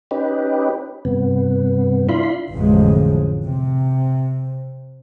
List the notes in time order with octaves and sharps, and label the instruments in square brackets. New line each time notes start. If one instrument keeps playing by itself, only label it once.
[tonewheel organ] C#4 D#4 G4 B4
G2 C3 B3
D4 E4 F4 B5 C6
[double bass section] A1 F2 D3 F3 G#3
C3